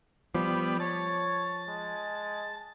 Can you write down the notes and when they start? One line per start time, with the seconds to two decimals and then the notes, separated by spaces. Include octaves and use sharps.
0.35 F3 G3 B3 D5
0.80 C#5 A5
1.68 G#3